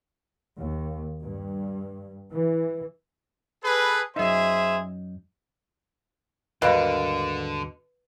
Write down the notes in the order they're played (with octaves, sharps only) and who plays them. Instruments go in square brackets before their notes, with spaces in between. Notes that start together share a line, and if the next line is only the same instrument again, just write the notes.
[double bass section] D#2
G2
E3
[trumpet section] G#4 A4 B4
[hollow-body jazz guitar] F#2 D#4 [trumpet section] G#4 C5 E5
[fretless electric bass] D#2 G#2 G3 [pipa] B2 [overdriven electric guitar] D3 [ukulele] A#4 F5